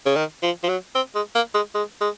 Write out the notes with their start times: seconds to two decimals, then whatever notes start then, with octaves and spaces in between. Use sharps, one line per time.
0.06 C#3
0.16 D#3
0.43 F3
0.64 F3
0.69 F#3
0.95 C4
1.15 G#3
1.35 A#3
1.55 G#3
1.75 G#3
2.01 G#3